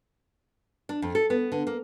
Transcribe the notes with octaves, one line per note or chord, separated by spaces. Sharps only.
D4
F2
A4
B3
D3
A#3